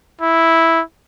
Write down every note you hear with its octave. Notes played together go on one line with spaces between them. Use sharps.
E4